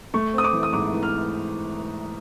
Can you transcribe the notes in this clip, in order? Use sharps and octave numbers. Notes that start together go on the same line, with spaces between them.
A3 C#6
C4 D#6
D6
E3
D#6
G#2 D6
E3
F6